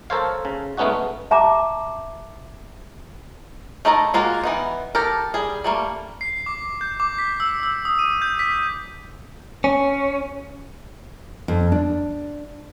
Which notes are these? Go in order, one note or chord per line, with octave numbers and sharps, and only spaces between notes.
A4 A#4 C5 C#5 F5
C#3
G#3 A3 B3 C#4 D#4 F#4
E5 A5 A#5 D6
A3 D#4 E4 A5 A#5
G#3 A#3 F4 F#4
E3 B3 D#4
G4 A4 A#4
G3 G#4
G3 A3 A#3
C7
D6
G6
D6
B6
E6
E6
D#6
D#7
G6
B6
C#4
F2
D4